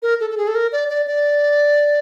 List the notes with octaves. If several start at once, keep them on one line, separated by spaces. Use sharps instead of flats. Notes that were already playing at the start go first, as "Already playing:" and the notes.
A#4
A4
A4
G#4
A4
A#4
D5
D5
D5